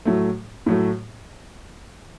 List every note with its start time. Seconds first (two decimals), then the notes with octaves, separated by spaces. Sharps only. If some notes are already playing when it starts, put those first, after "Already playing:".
0.05 A2 F#3 A3
0.66 A2 F#3 A3